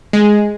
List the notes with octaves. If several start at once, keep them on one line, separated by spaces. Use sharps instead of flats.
G#3